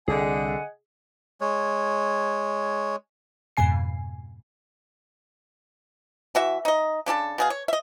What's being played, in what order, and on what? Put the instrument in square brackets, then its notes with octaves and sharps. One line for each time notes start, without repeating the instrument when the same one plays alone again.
[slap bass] C2 [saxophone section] D3 [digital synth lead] G#4 [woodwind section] D#5 F#5 G#5
[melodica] G#3 C#5
[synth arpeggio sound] F2 G#2 B2 G#5 C7
[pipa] E3 F#4 E5
D#4 D#5
C#3 D4 F4 A4
B2 G#4 F5
C#5
D#5 E5